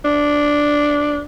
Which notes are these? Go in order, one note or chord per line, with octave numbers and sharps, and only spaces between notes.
D4